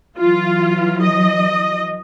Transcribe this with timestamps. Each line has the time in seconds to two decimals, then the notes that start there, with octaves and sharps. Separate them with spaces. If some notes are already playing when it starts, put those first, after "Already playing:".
0.19 E3 F#3 F4
1.03 D#5